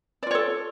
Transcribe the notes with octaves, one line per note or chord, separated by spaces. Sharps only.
F4 A4 C#5 D5